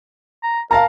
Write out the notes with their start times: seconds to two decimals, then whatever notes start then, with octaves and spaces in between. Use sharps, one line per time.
0.43 A#5
0.71 A#4 F5 A5 A#5